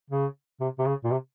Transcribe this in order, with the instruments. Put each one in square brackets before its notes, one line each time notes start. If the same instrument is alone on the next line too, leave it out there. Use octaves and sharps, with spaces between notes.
[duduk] C#3
C3
C3
C#3
A#2
C3